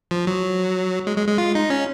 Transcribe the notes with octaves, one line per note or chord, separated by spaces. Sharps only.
F3
F#3
G#3
G#3
G#3
F4
D#4
C#4